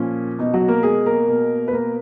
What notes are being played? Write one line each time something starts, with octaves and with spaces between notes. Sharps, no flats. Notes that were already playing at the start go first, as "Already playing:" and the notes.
Already playing: A#2 F3 C#4
B2 D#4
F#3 F#4
A#3 A#4
G#3 G#4
A#3 A#4
B2
B4
A#3 A#4